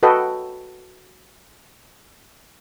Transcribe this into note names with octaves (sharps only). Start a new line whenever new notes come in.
F#4 A4 B4 D#5 G5